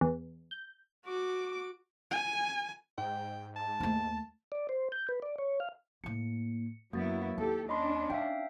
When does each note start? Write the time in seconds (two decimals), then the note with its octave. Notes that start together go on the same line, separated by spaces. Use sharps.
0.01 E2
0.51 G6
1.06 F#4 D6
2.11 G#5
2.98 G#2 G5
3.56 A5
3.80 D#2 A3
4.52 D5
4.69 C5
4.92 G6
5.09 B4
5.22 D5
5.38 C#5
5.60 F5
6.04 A2 A#3 C#7
6.93 F#2 F#3 A#3 B3 E4 F#4 A6
7.38 D#2 G4 A4
7.69 C#4 D4 D#5 B5 C6
8.10 D#4 E5 F5 G5